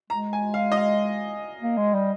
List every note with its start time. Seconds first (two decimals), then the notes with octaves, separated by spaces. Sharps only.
0.10 G#3 A#5
0.33 G#5
0.54 F5
0.72 D#5
0.77 F5
1.60 A#3
1.77 G#3
1.94 G3